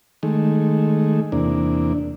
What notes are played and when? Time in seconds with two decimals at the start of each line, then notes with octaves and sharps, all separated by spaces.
0.23 D#3 G#3 A3
1.32 E2 C3 A#3 D4